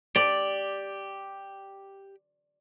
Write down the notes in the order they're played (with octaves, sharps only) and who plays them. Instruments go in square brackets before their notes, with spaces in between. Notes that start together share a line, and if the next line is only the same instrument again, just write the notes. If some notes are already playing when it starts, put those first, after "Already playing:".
[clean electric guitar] G4 [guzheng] D5